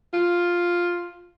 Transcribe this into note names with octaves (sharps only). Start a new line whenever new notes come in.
F4